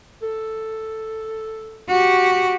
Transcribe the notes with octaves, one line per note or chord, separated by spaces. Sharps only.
A4
F#4 G4